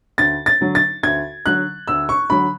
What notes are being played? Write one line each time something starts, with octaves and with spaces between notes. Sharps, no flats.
D2 A6
A6
D3 F#3
A6
D2 G#6
D3 F#3 F#6
D2 E6
C#6
D3 F#3 B5